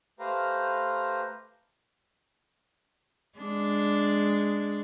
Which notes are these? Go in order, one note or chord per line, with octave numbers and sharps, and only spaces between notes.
A3 G4 B4 C5 F5 A#5
G#3 D4